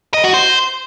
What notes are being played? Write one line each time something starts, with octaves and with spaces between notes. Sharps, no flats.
D#5
F#4
C5